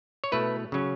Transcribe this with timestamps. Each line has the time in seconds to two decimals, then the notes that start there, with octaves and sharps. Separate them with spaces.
0.24 C#5
0.32 B2 A3 E4 B4
0.72 C#3 F#3 C#4